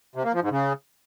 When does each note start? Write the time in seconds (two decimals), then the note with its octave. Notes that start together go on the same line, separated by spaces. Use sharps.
0.15 C3
0.24 A#3
0.33 F3
0.42 G#2
0.51 C#3